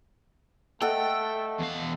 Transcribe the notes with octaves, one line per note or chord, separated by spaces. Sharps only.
A3 A4 D#5 F#5 G5
E2 F5